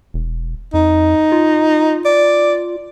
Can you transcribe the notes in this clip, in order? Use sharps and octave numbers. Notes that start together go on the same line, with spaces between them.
E1
F2 D#4
F4
D5